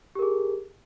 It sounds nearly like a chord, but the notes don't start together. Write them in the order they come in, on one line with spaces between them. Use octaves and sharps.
G4 A#4 G#4